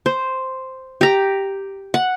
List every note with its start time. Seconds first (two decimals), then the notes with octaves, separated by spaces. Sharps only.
0.06 C5
1.01 G4 A#5
1.94 F#5